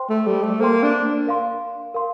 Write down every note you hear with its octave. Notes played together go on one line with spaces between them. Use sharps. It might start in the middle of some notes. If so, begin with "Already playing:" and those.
Already playing: C5 G5 C6
A3
G3
A3
A#3 C5 G5 C6
D4
A#4 F5 C6
A#4 F5 C6